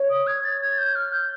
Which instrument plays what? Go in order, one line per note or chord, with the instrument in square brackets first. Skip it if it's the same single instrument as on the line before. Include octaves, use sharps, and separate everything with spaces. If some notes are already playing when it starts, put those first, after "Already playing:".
Already playing: [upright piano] C#5
[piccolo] D#6
G#6
A6
G#6
G6
F6
G6